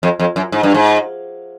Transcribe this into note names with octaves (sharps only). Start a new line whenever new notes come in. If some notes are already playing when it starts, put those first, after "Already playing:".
F2
F2
F#2
G#2
G2
G#2